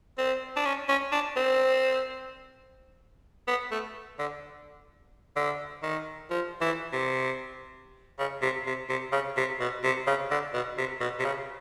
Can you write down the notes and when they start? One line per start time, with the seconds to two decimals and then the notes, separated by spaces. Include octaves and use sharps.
0.18 C4
0.56 D4
0.65 C#4
0.89 C#4
1.12 D4
1.36 C4
3.48 B3
3.71 A3
4.19 D3
5.36 D3
5.83 D#3
6.30 F3
6.61 E3
6.93 C3
8.19 C#3
8.42 C3
8.66 C3
8.89 C3
9.12 C#3
9.37 C3
9.60 B2
9.84 C3
10.07 C#3
10.30 D3
10.54 B2
10.78 C3
11.01 B2
11.19 C3
11.25 C#3